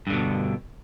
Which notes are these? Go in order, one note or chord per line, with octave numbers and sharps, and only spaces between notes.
G2 B2 D3